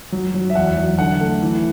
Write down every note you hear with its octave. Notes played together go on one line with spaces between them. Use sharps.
F#3
F#3
E5
E2 F#5
F#3
D3 F#5
A3
E3